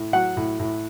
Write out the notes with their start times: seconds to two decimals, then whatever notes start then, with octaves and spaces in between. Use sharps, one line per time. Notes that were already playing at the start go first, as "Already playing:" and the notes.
Already playing: A2
0.13 F#3 F#5
0.37 A2
0.59 A2